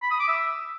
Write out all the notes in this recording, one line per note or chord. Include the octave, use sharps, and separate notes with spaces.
B5
D#6
D6
E5